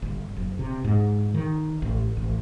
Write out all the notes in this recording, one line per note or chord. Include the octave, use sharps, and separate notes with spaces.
G1
F#1
C3
G#2
D#3
A1
A1